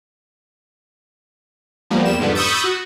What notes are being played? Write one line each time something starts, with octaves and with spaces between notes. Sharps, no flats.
F3 G3 A#3 B3
E2 G3 E7
F2 G#2 D3 G3 B3
B5 C#6 D#6 E6 G6 A6
F#4